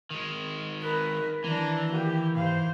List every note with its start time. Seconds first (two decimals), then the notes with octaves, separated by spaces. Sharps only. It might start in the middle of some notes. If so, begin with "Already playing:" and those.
0.11 D#3 G#3
0.82 A#4 B4
1.44 D#3 E3 D4 A#5
1.91 A#3 G4
2.36 G#2 C5 F5